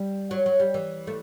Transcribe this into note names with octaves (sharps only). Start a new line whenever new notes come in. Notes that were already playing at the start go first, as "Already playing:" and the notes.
Already playing: G3
F#3
F#3
G3
E3
A3